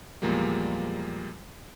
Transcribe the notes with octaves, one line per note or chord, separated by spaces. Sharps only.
E2 A#2 F3 G3 G#3 A#3